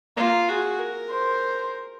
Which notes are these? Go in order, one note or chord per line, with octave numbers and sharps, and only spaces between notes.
A#3 F4
F#4 G#4
A#4
C5